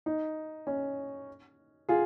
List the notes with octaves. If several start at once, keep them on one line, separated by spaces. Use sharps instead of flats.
D#4
C#4
F4 G#4